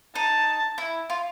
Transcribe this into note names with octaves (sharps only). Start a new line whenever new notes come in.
D#4 A5
E4
F4